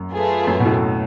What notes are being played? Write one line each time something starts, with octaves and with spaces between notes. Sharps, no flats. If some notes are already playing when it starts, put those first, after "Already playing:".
Already playing: F#2
A3 F4 G#4 B4
F#2
B2
A2